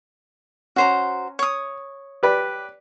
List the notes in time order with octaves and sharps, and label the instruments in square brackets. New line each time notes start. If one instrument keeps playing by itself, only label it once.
[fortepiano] C#4 [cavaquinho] F#4 C5 A#5
[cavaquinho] C#5 D#6
[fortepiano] G4 B4 D5